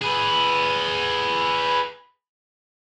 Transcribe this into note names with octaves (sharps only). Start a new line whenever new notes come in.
G#4 B4